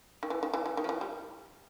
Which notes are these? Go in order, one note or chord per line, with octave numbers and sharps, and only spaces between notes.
D#3
E3
D#3
E3
E3
D#3
F3
E3
G3